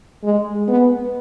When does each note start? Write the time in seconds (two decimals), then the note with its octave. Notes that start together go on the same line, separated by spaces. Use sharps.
0.24 G#3
0.68 B3